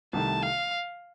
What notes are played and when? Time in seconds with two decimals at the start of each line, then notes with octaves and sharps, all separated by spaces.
0.13 C2 C3 D#3 A3 A5
0.43 F5